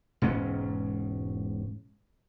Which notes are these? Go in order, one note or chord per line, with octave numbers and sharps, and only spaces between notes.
E1 G#2 C#4